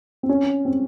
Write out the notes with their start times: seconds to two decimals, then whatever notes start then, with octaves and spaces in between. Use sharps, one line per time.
0.23 C4
0.29 C#4
0.65 C4